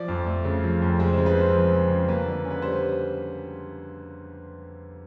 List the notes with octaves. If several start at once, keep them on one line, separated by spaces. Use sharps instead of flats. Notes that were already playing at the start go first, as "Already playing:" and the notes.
Already playing: F3 D5
F2
A3
C#3
F3
F2
G#3 C5
C#3 C5
B4
C4
C5
F3
G#3
C#3
A#3 B4
D3
C#4
B4
G3 C5